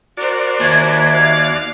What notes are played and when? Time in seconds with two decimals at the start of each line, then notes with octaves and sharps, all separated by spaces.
0.17 F#4 A#4 C5 D5
0.60 D#2 E5 G#6
1.13 F5